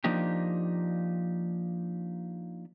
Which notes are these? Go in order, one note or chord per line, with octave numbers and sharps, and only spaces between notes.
F3 A#3 D4 D#4 G4